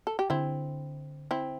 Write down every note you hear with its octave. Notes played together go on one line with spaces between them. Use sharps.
A4
G4
D3 C4 E4
C4 E4